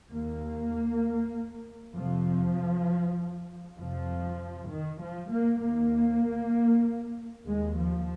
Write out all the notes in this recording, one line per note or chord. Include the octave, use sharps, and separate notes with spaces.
D#2 A#3
F2 C3 F3
F2 C3 F3
D#3
F3
A#3
D#2 A#3
D#2 G#3
F3